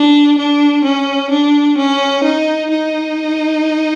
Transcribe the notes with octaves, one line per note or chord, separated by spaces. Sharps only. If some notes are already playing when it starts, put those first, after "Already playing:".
Already playing: D4
D4
C#4
D4
C#4
D#4
D#4